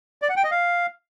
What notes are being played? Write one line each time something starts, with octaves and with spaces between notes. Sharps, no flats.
D5
F#5
G5
D#5
F5